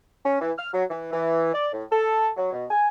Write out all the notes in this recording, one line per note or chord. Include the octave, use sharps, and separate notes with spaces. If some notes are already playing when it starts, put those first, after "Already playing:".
C#4
E3
F6
F#3
E3
E3
D5
A2
A4
F#3
B2
G#5